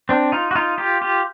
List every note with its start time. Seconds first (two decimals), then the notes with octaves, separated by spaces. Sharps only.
0.09 C4 D4
0.32 D#4 F4
0.51 F#4
0.55 D#4 F4
0.78 F4 G4
1.01 F4 G4